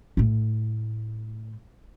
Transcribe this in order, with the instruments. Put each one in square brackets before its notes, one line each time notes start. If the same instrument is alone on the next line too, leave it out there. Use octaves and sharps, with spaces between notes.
[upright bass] A2 A3